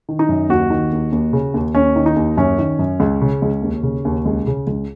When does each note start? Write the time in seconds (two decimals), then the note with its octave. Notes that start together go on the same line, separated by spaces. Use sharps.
0.09 D#3
0.19 D#4
0.29 F#2
0.49 D#2 F#4
0.70 D#3
0.92 D#2
1.12 D#2
1.33 C#3
1.54 D#2
1.75 D#2 C#4
1.96 D#3
2.06 D#4
2.16 D#2
2.37 F#2 C#4
2.58 D#3
2.79 F#2
3.00 C#2
3.22 C#3
3.42 C#2
3.62 D#2
3.83 C#3
4.05 D#2
4.26 C#2
4.47 C#3
4.67 C#2